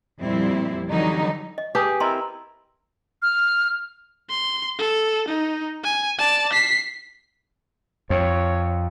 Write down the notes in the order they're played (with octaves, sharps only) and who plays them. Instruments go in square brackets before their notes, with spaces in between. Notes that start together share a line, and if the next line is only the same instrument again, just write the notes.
[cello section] F2 A#2 G3 C4 E4
D3 E3 F#3 G3 D#4
[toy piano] D#5
[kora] G4 [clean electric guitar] G#4 [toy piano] B4
[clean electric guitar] C4 E4 A#4 [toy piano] D#5 A5 C6
[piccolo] F6
[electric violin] C6
A4
D#4
G#5
D5 A5
B6 C7
[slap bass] F2 [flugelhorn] C#5